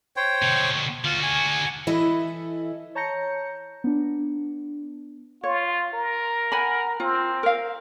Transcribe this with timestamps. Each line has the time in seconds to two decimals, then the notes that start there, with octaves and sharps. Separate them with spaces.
0.16 C5 C#5 G5
0.42 B2 D3
1.04 D3 F4 F#4
1.23 G#5
1.87 E3 E4 A4 D#5
2.95 C#5 A5 A#5 G6 A#6 C#7
3.84 B3 D4
5.44 F4 C#5
5.93 A#4
6.52 F#5 G#5 B5
7.00 C4 F4
7.43 A#4 F5